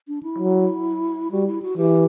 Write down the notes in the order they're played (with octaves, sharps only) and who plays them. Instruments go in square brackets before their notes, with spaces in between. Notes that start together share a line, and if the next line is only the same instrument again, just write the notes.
[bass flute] D4
E4
[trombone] F#3
[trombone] G3 [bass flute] F#4
[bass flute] E4
F#4
[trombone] E3 [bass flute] G4